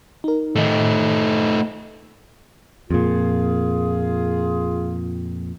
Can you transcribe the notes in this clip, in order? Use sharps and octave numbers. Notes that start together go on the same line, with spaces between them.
D#4 A#4
A2 D#3 A3 D#4
F2 A#2 F4 G#4